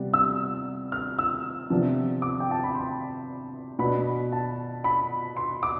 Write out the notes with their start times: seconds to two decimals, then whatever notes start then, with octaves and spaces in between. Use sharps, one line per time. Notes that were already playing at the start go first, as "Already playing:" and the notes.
Already playing: C3 G3 B3
0.14 E6
0.92 F6
1.19 E6
1.70 C3 F3 B3 D4
2.22 D6
2.40 G5
2.51 A5
2.64 B5
2.75 C6
3.79 B2 B3 D4 B5
4.32 A5
4.84 B5
5.37 C6
5.63 D6